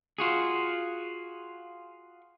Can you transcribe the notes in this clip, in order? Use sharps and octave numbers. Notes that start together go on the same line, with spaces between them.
F4 F#4 G#4